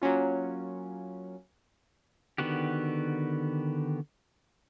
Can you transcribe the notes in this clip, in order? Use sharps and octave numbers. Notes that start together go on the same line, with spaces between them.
F#3 A#3 C#4 F4
D3 D#3 B3 F#4 G4